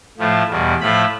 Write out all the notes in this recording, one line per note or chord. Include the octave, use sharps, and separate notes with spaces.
A2 F3 A3
E2 B2 G3
A2 F3 A3 B5